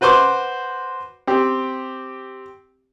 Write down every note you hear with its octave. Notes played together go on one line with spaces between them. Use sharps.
F#4 B4 C5 C6 D6
C4 G4